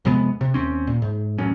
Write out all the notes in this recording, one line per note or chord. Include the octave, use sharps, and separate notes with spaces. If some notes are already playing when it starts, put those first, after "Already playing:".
F2 C3 G#3 B3
C3
D#2 C4 C#4
A#2
G#2
D1 A1 F#2 C#4